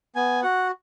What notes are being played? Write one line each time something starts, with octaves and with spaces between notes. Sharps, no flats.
B3 G#5
F#4 F#5